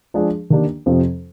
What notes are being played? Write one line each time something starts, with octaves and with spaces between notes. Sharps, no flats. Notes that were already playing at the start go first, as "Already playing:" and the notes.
F3 G#3 D4 G#4
D#3 A#3 D4 G4
F2 C3 F3 C4 F4